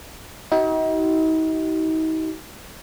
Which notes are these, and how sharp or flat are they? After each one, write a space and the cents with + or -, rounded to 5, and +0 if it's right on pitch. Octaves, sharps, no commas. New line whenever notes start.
D#4 +40 F#4 +45